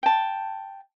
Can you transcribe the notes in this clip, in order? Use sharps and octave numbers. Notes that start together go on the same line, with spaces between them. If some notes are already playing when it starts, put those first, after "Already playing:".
G5 A5